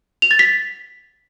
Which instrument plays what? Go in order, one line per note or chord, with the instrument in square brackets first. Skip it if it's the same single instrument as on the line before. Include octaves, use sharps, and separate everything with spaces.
[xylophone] F7
A6
B6